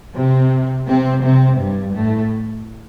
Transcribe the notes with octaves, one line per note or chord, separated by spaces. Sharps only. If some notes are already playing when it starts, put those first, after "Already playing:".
C3 C4
C3 C4
C3 C4
G2 G3
A2 A3